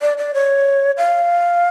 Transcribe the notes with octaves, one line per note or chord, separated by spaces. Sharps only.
D5
D5
C#5
F5